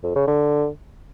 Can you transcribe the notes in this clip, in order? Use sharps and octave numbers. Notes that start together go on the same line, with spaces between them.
F2
C#3
D3